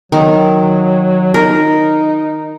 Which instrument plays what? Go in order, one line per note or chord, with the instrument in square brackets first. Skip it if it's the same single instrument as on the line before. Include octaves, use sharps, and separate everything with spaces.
[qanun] D#3 [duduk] F#3
[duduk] D#4 [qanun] A#4